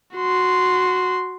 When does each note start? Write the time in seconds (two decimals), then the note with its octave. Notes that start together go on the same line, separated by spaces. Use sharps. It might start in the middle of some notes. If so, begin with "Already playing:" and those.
0.16 F#4 C6